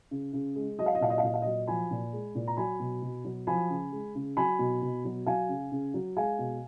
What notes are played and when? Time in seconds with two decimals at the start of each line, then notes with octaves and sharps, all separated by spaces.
0.11 C#3
0.33 C#3
0.56 G#3
0.78 F#3 D#5
0.86 F5
0.95 D#5
1.01 A#2 F5
1.10 D#5
1.18 F5
1.23 A#2 D#5
1.34 F5
1.42 F#3 D#5
1.67 F3 G#5 B5
1.91 A#2
2.13 G#3
2.35 A#2
2.47 A#5
2.57 F#3 G#5 B5
2.80 B2
3.02 B2
3.25 F#3
3.47 F3 G#5 B5
3.70 C#3
3.92 G#3
4.15 C#3
4.37 F#3 G#5 B5
4.59 B2
4.82 B2
5.05 F#3
5.26 F#3 F5 G#5
5.49 C#3
5.72 C#3
5.94 F#3
6.17 G#3 F5 G#5
6.39 B2